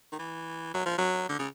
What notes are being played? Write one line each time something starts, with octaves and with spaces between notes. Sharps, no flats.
D#3
E3
F#3
F3
F#3
D3
C#3